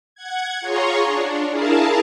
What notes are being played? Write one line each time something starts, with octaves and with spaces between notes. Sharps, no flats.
F#5 G#6
F4 G#4 C#5 A#5 C6 C#6
D4
E4 G#4 A#4 F5 A5